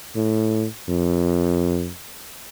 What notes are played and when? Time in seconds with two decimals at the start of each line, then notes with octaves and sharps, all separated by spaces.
0.16 A2
0.89 F2